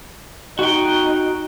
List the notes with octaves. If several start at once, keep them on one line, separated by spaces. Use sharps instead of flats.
D#4 F#4 G5